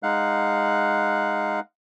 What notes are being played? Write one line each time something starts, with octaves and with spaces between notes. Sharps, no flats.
G#3 D#4 F5 F#5 F#6